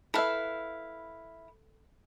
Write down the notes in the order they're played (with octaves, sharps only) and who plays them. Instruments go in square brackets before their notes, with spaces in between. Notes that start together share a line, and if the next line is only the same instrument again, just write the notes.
[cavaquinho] E4 F5 [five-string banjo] A4 B4 E5